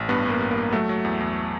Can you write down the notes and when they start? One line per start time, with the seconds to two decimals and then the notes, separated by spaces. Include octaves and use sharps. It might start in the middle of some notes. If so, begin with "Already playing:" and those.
Already playing: A1
0.09 G2 B3
0.25 G2 A#3
0.40 G2
0.51 A#3
0.57 G2
0.72 F#3 A3
0.89 F#3
1.05 E2
1.20 E2